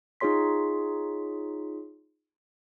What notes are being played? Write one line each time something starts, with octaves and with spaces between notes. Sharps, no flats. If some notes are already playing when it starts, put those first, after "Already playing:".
D#4 F4 G#4 C#5 C6 B6